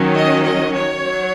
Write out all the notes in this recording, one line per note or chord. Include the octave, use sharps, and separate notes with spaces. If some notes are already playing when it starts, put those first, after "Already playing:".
Already playing: D#3 F#3 C#4
D#5
D#5
C#5
F#3